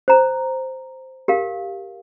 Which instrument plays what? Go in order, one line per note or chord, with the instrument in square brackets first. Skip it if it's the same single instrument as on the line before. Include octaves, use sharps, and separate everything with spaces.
[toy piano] C5 A#5
G4 A#4 F5